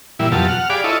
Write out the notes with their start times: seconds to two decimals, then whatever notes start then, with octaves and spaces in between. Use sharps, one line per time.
0.19 A#2 E3 G3 E4
0.32 F2 B2 F#3 F4 G4 A5
0.48 F#5 F6
0.70 G4 G#4 D5 F5 B5 D6
0.84 E4 F4 A4 C#5 D#5